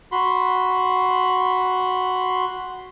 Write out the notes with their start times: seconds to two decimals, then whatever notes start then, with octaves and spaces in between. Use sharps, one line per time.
0.12 F#4 B5 C6